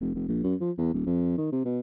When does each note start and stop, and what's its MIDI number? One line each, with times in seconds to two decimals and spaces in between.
0.01 0.10 29
0.14 0.26 29
0.28 0.39 34
0.43 0.55 42
0.60 0.71 53
0.78 0.94 40
0.94 1.05 27
1.06 1.37 41
1.37 1.49 51
1.52 1.65 48
1.65 1.80 47